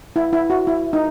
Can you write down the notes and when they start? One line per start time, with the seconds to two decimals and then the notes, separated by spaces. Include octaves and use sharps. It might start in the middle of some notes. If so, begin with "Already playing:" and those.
0.16 E4
0.33 E4
0.50 F#4
0.67 E4
0.93 D#4